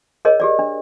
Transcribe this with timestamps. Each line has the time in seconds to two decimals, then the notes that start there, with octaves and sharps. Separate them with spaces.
0.25 G#4 A#4 C#5 D#5
0.40 G4 G#4 D5
0.59 D4